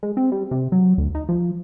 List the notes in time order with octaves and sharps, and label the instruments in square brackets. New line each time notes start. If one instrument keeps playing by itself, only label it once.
[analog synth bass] G#3
C4
G3
C3
F#3
D2
D#4
F3